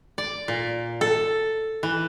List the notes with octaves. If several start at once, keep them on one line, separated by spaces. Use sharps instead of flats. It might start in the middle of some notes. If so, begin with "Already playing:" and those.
D5
A#2
A4
E3